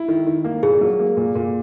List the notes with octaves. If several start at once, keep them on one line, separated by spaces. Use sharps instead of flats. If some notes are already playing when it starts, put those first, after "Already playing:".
Already playing: E4
D#3
D#3
A#3
A#2 G#4
F#3
A#3
A#2
A#2